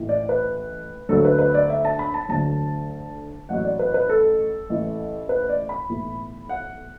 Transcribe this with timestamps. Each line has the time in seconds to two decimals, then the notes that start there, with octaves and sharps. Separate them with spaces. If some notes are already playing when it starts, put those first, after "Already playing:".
Already playing: A1 A2 E3
0.09 D5
0.29 B4
1.09 D2 D3 F#3 A4
1.25 B4
1.39 B4
1.55 D5
1.70 E5
1.85 A5
1.99 B5
2.14 A5
2.29 D2 D3 F#3 A5
3.49 A1 A2 F#3 F#5
3.65 D5
3.79 B4
3.94 B4
4.09 A4
4.70 A1 A2 E3
5.29 B4
5.49 D5
5.69 B5
5.89 B1 A2 E3
6.49 F#5